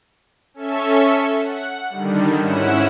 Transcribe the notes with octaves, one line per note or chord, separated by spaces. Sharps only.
C#4 A4 E5 C#6
F#5
D3 D#3 G3
G#2 C#4 E4 F#5 E7